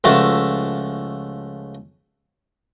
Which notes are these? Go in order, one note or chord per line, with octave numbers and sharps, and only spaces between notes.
C#2 F3 A3 F#4 E5 A5